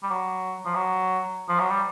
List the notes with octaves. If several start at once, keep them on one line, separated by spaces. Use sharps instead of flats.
G3
F#3
F3
F#3
F3
F#3
G3